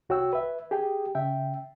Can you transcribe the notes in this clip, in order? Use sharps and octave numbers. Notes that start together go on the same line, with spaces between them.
C2 F#4 C#5 G5 E6
B4 E5
G4 G#4 G5
C#3 E5 G5